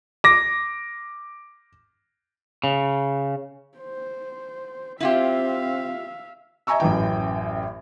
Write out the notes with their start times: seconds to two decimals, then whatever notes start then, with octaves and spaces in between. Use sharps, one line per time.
0.24 D6 A#6
2.64 C#3
3.78 C5
5.00 C4 E4 F4 G4 E5 F5
6.67 D#5 E5 G#5 A#5 C#6 E6
6.80 A1 F#2 E3 G5